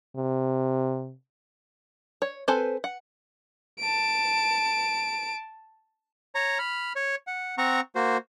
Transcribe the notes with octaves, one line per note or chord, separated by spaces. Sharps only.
C3
C#5
C4 A4 B4 C5 G#5
F#5
A5 D7
C#5 A#5
B5 F6
C#5
F#5
C4 F#5 A#5 C#6
A#3 F#4 C5